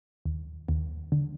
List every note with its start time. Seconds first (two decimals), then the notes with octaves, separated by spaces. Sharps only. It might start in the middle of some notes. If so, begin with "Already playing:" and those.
0.25 D#2
0.69 D#2
1.12 D3